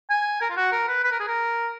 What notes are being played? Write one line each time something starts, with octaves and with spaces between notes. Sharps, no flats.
G#5
A#4
F4
F#4
A#4
B4
B4
A#4
G#4
A#4